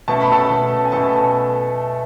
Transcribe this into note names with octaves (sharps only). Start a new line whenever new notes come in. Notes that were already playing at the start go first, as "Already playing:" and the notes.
B2 A3 C#4 A5
B5
A4 A5
B2 A3 C#4
G#5
B2 A3 C#4 A4 A5